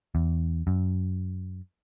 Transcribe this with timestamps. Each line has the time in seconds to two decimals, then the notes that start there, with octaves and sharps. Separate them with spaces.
0.15 E2
0.67 F#2